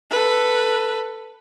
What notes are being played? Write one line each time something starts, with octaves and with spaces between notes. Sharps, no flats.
A4 B4